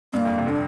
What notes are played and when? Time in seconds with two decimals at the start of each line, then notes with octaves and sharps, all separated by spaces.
0.13 G2 A#3 C4
0.25 F2
0.38 C3
0.46 D3
0.49 D4